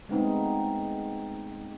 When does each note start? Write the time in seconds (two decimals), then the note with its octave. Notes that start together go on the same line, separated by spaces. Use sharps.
0.09 G#3 A3 B3 C4 D#4